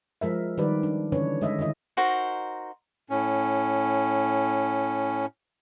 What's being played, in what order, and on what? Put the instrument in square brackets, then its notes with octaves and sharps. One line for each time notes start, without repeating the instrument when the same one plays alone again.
[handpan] F3 G#3 A#4 E5
D#3 G3 B4 D5
D4
D3 E3 C#4 D4 B4 C#5
G#3 D#5 E5
D3 D#3 E4 D#5
[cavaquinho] D#4 F#4 A#4 C5
[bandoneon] A2 C#4